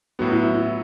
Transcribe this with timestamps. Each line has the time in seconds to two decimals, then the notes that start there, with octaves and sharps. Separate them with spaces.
0.19 A2 F#3 B3 F#4
0.32 E4
0.43 E4
0.55 E4